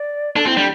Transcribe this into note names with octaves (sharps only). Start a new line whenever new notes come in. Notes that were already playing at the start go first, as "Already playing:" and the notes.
Already playing: D5
D4 A4
C4 E4
G3 D4